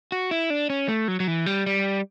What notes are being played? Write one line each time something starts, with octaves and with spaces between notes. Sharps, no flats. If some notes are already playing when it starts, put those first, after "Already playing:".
F#4
E4
D4
C#4
A3
F#3
F#3
E3
G3
G3